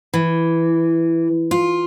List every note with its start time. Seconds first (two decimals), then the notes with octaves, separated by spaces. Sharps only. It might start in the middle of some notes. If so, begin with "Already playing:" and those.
0.14 E3
1.51 F4